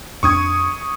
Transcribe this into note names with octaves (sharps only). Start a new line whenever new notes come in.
F2 D4 C#6 D#6 G#6